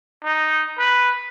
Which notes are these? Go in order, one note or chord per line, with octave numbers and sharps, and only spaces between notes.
D#4
B4